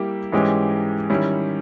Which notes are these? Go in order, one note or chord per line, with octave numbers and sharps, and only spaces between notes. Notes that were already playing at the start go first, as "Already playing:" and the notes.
Already playing: G3 A#3 E4 G4
G#2 E3 G#3 C#4 G4
D#3 G3 C#4 E4